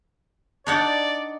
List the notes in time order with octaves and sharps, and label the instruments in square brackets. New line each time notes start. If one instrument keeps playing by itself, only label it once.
[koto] D4 D#4 F#5 [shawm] D5